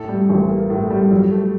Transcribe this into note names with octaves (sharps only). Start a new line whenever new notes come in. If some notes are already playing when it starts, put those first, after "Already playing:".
Already playing: A2 A4
G3
A1
A#3
A2
G3
F#3
A3